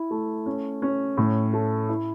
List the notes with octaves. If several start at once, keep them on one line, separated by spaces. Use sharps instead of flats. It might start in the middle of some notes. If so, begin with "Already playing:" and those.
Already playing: E4
A3
C#4
C#4
A2
A3
E4